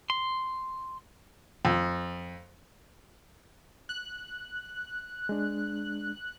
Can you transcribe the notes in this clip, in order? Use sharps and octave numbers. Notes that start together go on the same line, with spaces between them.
C6
F2
F#6
G#3 D4